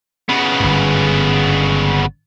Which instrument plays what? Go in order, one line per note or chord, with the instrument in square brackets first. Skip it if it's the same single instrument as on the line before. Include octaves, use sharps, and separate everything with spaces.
[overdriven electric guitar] C#3 B3
[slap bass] G1 G#2